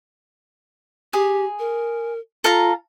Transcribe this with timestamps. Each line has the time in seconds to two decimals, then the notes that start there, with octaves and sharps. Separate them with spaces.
1.13 G4 G#4
1.59 A#4
2.44 F4 A4 F5 A#5